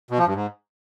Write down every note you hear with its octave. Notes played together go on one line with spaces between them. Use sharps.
B2
F3
G2
G#2